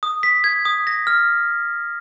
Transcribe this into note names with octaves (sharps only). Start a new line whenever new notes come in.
D#6
B6
G#6
D#6
A#6
F6